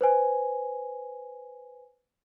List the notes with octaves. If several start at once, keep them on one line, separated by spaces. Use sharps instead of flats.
B4 C5 G#5